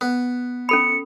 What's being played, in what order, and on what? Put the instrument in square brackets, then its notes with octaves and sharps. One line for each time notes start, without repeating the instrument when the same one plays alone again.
[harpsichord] B3
[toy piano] C#4 A4 B5 [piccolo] C#7